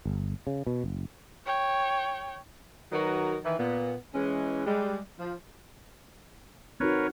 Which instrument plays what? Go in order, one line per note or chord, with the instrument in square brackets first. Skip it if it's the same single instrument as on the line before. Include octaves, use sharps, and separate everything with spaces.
[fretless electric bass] G1
C#3
B2
F#1
[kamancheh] C#5 G5
[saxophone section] D#3 F#3 D#4 F#4 A#4 B4
D#3 E3 B4
A#2 B3
E3 G#3 C#4
G3 G#3
F3
[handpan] C4 D#4 F#4 [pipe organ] A#4 B4 C#5